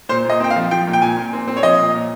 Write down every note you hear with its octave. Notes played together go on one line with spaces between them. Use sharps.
A#2 C5
A#2 D#5
C4 G5
F5
F3
F3 G5
A#2
G5
A#2 G#5
A#2
C4
C4
C#5
F3 D#5
A#2
A#2